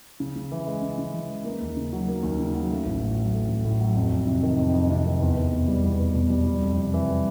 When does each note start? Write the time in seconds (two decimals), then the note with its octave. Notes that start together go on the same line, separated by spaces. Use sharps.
0.20 C#3
0.36 C#3
0.52 E3
0.67 G#3
0.83 C#3
0.98 C#3
1.13 E3
1.29 G#3
1.45 A#3
1.60 D#2
1.77 C#3
1.93 F#3
2.08 A#3
2.23 D#2
2.39 C#3
2.54 F#3
2.71 A3
2.85 A1
3.01 A2
3.17 F#3
3.33 A3
3.48 A1
3.65 A2
3.80 F#3
3.95 F2
4.12 F2
4.27 C3
4.43 D#3
4.59 F2
4.74 F2
4.90 C3
5.06 D#3
5.20 E2
5.37 E2
5.53 B2
5.68 G3
5.84 E2
6.00 E2
6.14 B2
6.30 G3
6.46 G3
6.62 F2
6.77 C3
6.94 E3
7.08 G3